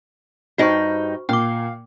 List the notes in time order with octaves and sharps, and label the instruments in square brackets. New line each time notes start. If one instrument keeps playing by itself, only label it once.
[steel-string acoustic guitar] G2 D#4 G5 [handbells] F#4 C5 C#6
[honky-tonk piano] A#2 [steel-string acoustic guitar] F5 [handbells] G5 D6